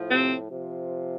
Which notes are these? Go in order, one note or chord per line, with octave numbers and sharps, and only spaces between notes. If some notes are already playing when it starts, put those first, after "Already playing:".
Already playing: A2 F3
C3 C4
C3 F3